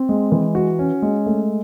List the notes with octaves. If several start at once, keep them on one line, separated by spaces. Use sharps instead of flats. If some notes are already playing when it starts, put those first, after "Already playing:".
Already playing: C4
G#3
E3
F#4
C#4
G#3
A3